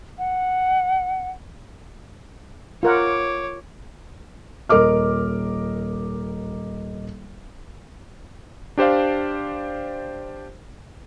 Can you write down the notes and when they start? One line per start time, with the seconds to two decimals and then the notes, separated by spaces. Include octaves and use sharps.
0.18 F#5
2.83 F4 A#4 C#5 F#5 D6
4.69 D#1 A#4 D#5 D6 F6
8.77 D4 G4 C5 D5 F5